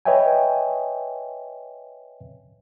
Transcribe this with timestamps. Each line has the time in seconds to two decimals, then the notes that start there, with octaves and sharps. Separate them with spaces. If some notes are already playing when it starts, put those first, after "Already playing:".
0.05 B4 C#5 D#5 E5 G5 G#5